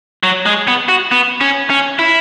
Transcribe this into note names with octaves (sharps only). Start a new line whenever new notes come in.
F#3
G#3
B3
F#4
B3
C#4
C#4
E4